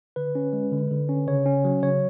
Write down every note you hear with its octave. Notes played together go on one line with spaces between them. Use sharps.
D3 B4
C#4
G#3
D3
D3
C#4
C#3 C#5
C#4
F#3
C#3 C#5